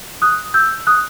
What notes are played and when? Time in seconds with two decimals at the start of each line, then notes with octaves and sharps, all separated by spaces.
0.22 D#6 F#6
0.54 E6 G6
0.87 D#6 F#6